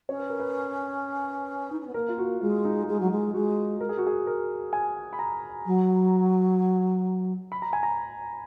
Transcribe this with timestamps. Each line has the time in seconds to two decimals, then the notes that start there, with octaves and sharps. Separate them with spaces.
0.09 C#4 C#5
0.20 B4
0.30 A#4
0.40 B4
1.72 D#4
1.80 C#4
1.87 B3
1.94 A#3 A#4
2.08 F4
2.18 F#4
2.40 G#3 F4
2.65 D#4
2.88 G#3
3.00 F#3
3.11 G#3
3.33 G#3 F#4
3.81 A#4
3.89 G#4
3.98 F#4
4.07 G#4
4.27 A#4
4.73 G#5
5.13 B5
5.19 A#5
5.65 F#3
7.52 B5
7.62 A#5
7.73 G#5
7.83 A#5